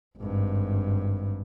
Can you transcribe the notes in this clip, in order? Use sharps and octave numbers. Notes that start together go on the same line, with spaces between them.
G#1 G2